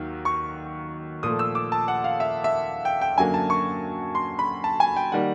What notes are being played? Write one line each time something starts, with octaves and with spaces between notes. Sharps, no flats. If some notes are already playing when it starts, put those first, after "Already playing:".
Already playing: D#2 D#3 F#3
C#6
A#2 F3 A3 D#6
E6
D6
A5
F#5
F5
E5
E5
G5
G5
F#2 D3 F#3 A#3 G#5
A5
C#6
C6
B5
A5
G#5
G5
D#3 G3 A#3 F#5